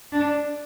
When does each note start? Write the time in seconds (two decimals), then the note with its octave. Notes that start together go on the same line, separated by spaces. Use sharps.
0.12 D4